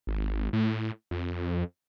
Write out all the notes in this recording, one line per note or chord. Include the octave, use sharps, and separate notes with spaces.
G#1
A2
F2